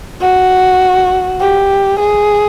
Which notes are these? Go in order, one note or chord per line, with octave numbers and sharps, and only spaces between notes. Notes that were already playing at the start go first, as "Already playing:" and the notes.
F#4
G4
G#4